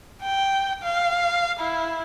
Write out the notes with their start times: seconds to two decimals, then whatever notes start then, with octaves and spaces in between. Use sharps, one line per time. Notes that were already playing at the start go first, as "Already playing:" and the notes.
0.22 G5
0.83 F5
1.59 E4